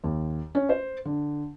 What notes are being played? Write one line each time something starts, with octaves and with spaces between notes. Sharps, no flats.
D#2
C#4
C5
D3